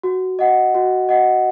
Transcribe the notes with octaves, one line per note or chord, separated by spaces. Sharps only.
F#4
D#5 F#5
F#4
D#5 F#5